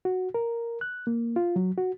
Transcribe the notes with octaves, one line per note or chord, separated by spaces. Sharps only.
F#4
A#4
F#6
A#3
F4
F#3
F#4